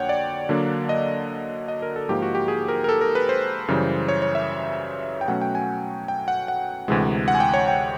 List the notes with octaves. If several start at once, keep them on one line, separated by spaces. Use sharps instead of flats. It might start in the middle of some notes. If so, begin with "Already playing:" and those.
Already playing: F2 D3 F#3 A#3 C#5 F#5 G5
D5
D3 F#3 A#3 D4
D#5
D#5
A#4
A4
G#2 F3 A#3 D#4 G4
F#4
G4
G#4
A#4
A#4
A4
A#4
B4
C5
F#2 C#3 E3 G3
C#5
C#5
E5
G5
B2 F#3 A3 C#4 F#5
G5
G#5
G5
F#5
F#5
D2 C3 E3 G#3
F#5
G#5
G5
C#5
G5